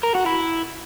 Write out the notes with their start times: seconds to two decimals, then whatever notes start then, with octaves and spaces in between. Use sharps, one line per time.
0.03 A#4
0.15 F#4
0.26 E4